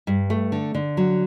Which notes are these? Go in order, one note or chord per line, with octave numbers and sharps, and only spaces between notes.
G2
A3
D3
D3
F#3